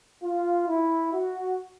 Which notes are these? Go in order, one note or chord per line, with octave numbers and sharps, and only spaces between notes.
F4
E4
F#4